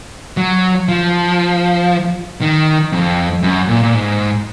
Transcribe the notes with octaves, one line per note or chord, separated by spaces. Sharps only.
F#3
F3
D#3
F2
F#2
A#2
A#2
G#2